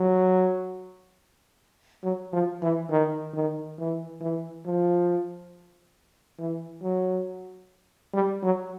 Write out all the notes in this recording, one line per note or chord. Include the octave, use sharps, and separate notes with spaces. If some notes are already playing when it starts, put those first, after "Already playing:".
Already playing: F#3
F#3
F3
E3
D#3
D#3
E3
E3
F3
E3
F#3
G3
F#3